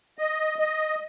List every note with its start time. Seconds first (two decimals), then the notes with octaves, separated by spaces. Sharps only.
0.18 D#5
0.59 D#5